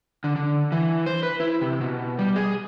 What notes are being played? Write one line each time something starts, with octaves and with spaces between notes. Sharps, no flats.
D3
D3
E3
C5
B4
E4
C3
B2
G3
G#4